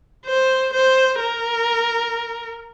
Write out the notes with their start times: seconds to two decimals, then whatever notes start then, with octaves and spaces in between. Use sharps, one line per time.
0.26 C5
0.73 C5
1.20 A#4